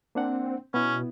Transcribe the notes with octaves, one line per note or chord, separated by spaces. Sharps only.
A#3 C4 D4 F#5
B2 B3 C#4 E4